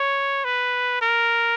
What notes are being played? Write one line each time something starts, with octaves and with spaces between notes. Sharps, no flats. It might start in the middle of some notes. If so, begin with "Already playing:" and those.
Already playing: C#5
B4
A#4